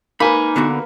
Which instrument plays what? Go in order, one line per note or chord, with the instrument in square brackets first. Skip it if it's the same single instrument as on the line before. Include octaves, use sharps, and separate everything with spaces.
[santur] A#3 B4 [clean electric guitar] D#4 G#5 [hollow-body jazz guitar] B5
[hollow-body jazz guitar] D3 B3 F#4